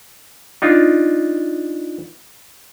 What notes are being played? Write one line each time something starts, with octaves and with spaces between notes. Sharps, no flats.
D4 D#4 F4